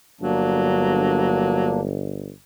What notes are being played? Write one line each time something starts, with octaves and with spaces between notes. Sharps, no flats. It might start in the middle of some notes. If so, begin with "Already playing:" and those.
G1 F#3 A#3 D4